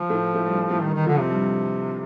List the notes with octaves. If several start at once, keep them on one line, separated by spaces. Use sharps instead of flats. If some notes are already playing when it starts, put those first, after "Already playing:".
Already playing: F3
A2 A3
A2 A3
G2 G3
G2 G3
A2 A3
G2 D#3 G3
D#3
F2 D3 F3
C3
G2 G3